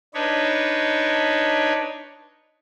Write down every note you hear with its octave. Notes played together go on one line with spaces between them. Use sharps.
D4 D#4 B4 C#5